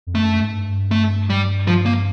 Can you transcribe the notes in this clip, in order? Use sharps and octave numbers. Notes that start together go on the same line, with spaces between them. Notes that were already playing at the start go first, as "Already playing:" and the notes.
F2
F#2 A3
G#2
G2
A3
G3
F3
A#3